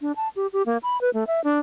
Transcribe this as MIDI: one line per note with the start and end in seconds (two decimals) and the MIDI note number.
0.01 0.12 62
0.16 0.28 81
0.36 0.47 67
0.53 0.63 67
0.66 0.78 58
0.83 1.00 83
1.01 1.10 71
1.14 1.24 57
1.27 1.43 76
1.44 1.59 62